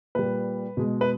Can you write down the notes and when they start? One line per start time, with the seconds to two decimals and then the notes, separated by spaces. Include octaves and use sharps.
0.15 A#2 G3 B4
0.77 B2 G#3
1.01 B4